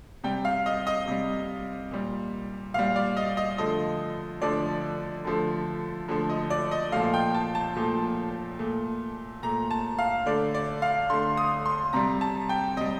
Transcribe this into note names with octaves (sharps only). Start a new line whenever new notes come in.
C3 G3 G5
F5
D#5
D#5
C3 G3
A#2 G3
A#2 G3 F5
D5
D#5
D#5
D3 F3 A3 D#5
D3 F3 A3 D5
D3 F3 A3
D3 F3 A3
D#5
D5
D#5
A#2 F3 A3 F5
G5
A5
A5
A#2 F3 A3
A#2 A3
A#2 A3 A#5
A5
F5
D3 A3 D5
D5
F5
D3 A3 C6
D#6
C6
C3 G3 A#5
A5
G5
C3 G3 D#5